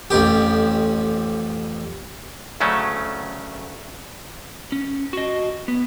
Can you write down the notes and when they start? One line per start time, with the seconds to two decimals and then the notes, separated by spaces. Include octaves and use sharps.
0.10 A1 F2 G4
2.60 D2 C#3 F#3 A3 C#4
4.72 C#4
5.13 F#4 D#5
5.68 B3